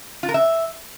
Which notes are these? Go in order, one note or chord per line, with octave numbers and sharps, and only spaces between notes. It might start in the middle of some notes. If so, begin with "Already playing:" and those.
F4
A#4
E5